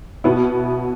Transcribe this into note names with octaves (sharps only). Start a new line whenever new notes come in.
B2 B3 E4